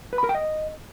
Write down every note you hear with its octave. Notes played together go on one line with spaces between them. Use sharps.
B4
B5
A#4
G5
D#5